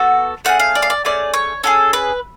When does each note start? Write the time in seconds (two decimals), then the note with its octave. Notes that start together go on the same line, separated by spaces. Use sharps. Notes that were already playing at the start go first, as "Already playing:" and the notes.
Already playing: B3 F#4 A4
0.45 A3 C#4 G#4 F#5
0.59 F5
0.75 D5
0.82 F5
0.90 D5
1.05 A3 C#4 G#4 D5
1.34 C#5
1.64 C#4 F4 G#4 A4
1.93 B4